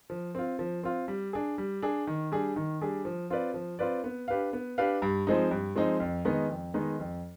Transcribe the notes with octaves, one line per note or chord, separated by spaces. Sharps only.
F3
C4 F4
F3
C4 F4
G3
D4 G#4
G3
D4 G#4
D#3
G3 D4 G#4
D#3
G3 D4 G#4
F3
C4 F4 B4 D5
F3
C4 F4 B4 D5
B3
D4 G4 B4 F5
B3
D4 G4 B4 F5
G2
F3 G#3 C4 D#4
G2
F3 G#3 C4 D#4
F2
D#3 G#3 B3 D#4
F2
D#3 G#3 B3 D#4
F2